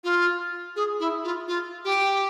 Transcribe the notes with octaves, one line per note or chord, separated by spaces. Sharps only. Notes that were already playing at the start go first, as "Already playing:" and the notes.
F4
G#4
E4
F4
F4
G4